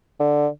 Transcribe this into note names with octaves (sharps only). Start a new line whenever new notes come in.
D3